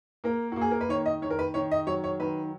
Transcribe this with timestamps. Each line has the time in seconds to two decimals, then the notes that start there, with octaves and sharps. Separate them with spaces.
0.24 A#3 A#4
0.52 F#4
0.56 A#3
0.61 G#4
0.71 A#4
0.81 B4
0.89 D#3 C#5
1.06 D#5
1.22 D#3 C#5
1.30 A#4
1.39 B4
1.54 D#3 C#5
1.71 D#5
1.87 F#3 C#5
2.04 C#5
2.20 D#3 B4